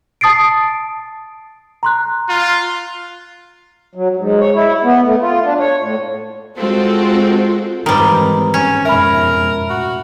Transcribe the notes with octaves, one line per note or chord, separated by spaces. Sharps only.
A5 D#6 A6 C7 D7
A#5 C6 F#6
F4
F#3
G#2
C#5
E4
B3
A3
F4
D4
C#5
A2
G#3 C4 F4 F#4 A4 C5
G#2 D#3 E3 G3 C4 B4 A#5
C#4
F2 G#2 B2 A#4 E5 B5
A2 F#4